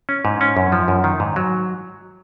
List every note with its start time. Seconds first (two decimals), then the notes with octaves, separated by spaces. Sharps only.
0.09 C#4
0.25 G#2
0.41 C#4
0.57 F#2
0.72 F3
0.88 F#2
1.04 D#3
1.20 G#2
1.36 F#3